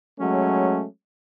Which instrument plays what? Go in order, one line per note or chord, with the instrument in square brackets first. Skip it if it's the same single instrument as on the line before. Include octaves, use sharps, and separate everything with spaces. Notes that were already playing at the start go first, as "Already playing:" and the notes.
[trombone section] F#3 G#3 A3 C#4